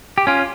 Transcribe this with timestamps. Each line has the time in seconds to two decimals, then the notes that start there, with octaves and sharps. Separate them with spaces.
0.18 G4
0.27 C#4 F4